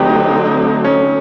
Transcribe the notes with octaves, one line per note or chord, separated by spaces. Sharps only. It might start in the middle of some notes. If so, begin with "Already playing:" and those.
Already playing: D3 F#3 A3 C4 D#4 G4 B4 C#5
C#4